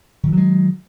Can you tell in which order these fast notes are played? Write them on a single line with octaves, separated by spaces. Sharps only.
D#3 E3 F#3 G#3